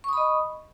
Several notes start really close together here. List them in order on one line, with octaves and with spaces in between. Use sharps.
C#6 D#6 B5 D#5